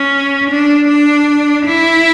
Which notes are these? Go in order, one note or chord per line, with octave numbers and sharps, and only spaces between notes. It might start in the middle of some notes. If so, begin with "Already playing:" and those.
Already playing: C#4
D4
D4
E4